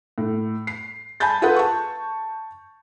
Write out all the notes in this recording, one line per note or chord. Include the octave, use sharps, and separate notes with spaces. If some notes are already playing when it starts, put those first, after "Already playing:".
A2
C7
G#5 A5 B5 G6 A6
F4 G#4 A4 B4 F#5
A5 C#6